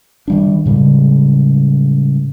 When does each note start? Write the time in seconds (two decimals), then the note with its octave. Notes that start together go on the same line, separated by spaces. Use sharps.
0.28 D#3 G3 D4
0.65 A2 C#3 G3 G#3